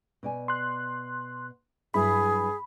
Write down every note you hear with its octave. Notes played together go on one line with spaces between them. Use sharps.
B2 D5 G#5
C6 F#6
G2 F#3 E4 G#4 B5